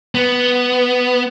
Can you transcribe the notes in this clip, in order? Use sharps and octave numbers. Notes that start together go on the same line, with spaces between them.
B3